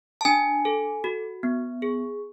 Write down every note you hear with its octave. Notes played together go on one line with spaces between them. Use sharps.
A5
D4 G#5
A4
F#4
B3
G#4